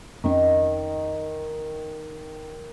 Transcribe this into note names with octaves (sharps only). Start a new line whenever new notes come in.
F2 D#3 C4 C#4